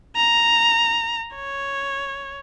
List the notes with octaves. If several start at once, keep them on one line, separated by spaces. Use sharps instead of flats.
A#5
C#5